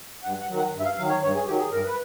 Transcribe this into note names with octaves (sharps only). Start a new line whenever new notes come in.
G2 F#5
F#5
D#3 F#3
F#5
G2
E5
F5
D#3 F#3 F5
C#5
G2 C#5
G#4
D#3 F#3 G4
G#4
G2 A#4
B4